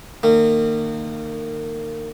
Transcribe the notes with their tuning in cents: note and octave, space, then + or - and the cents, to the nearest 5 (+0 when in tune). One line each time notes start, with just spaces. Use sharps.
D#3 -30 A#3 -30